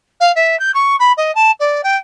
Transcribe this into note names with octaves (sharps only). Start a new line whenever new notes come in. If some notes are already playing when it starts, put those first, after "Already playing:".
F5
E5
G6
C#6
B5
D#5
A5
D5
G5